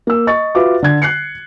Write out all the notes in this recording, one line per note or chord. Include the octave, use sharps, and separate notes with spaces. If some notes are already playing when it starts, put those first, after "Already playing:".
A#3 E6
D#5 C#6 A6
F4 F#4 B4 E5 F5 D6
D3 G#6
F#6 C7 C#7